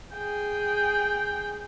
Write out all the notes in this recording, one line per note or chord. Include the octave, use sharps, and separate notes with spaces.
G#4 G5